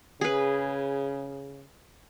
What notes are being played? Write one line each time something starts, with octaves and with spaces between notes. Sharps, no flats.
C#3 G#4 B4